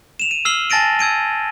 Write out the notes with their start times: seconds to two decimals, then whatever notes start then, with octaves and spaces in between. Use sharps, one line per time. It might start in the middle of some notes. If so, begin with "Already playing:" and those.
0.20 E7 F7
0.31 D#7
0.45 E6 F6 C7 F#7 G7
0.70 G#5 A5 A6 A#6 D7 D#7
0.99 E6 G#6 D7 D#7